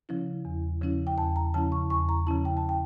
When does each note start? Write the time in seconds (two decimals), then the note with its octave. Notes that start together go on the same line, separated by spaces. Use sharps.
0.09 C#3 F3 C#4 E4
0.45 E2
0.82 C#3 F3 C#4 E4
1.07 G5
1.18 E2 A5
1.36 A#5
1.54 C#3 F3 C#4 E4 A5
1.72 C#6
1.90 E2 C#6
2.09 A#5
2.27 C#3 F3 C#4 E4 A5
2.45 G5
2.57 A5
2.69 G5